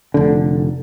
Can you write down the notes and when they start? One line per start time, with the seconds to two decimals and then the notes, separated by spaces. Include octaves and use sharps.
0.14 F1 D3